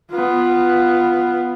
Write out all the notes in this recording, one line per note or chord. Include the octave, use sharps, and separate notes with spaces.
B3 F4